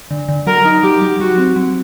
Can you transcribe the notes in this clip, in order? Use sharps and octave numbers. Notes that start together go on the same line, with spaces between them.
D3
D3
F#3 A#4
D#4
F#3 G4
F#3
F#3 F#4
C4
F#3